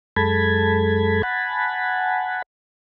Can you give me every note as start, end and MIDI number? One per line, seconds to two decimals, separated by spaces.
0.16 1.22 42
0.16 1.22 56
0.16 1.22 69
0.16 1.22 81
0.16 1.22 83
0.16 1.22 92
1.23 2.42 78
1.23 2.42 80
1.23 2.42 81
1.23 2.42 83